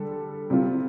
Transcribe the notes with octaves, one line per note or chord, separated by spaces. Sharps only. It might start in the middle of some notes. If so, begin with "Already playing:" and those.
Already playing: D3 G3 A4
C3 G3 F4